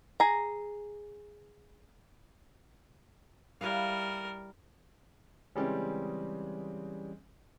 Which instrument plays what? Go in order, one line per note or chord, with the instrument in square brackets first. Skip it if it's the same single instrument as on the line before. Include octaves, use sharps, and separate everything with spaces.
[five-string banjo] G#4 A#5
[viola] G3 A#4 [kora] E4 B4 F5
[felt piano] C#3 G#3 C4 [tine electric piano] E3 G3 C#4